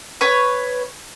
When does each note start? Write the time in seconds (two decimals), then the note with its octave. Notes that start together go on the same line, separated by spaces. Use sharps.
0.21 B4 C#5